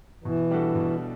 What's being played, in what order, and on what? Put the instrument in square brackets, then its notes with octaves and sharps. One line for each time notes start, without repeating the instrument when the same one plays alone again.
[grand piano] B2 [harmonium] E3
[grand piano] G3 D4 F#4 A4
B2